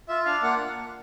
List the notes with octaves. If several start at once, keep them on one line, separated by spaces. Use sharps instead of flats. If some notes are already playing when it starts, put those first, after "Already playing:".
F4 E5
D4 F5
A#3 F#5